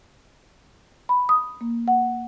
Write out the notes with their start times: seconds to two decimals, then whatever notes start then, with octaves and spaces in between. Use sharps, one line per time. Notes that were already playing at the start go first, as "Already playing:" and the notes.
1.09 B5
1.29 D#6
1.61 A#3
1.88 F#5